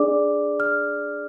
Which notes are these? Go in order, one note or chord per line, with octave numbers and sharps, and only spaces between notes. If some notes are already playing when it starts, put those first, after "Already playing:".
Already playing: D4 G#4 D5 D6
F6